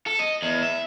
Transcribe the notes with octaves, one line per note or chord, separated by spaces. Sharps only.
A4
D#5
E2
E5